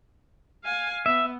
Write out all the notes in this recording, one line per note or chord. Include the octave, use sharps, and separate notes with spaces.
F5 G#5
B3 E5